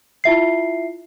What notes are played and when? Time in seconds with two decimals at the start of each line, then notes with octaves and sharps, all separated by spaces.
0.24 E4 F4 E5 C7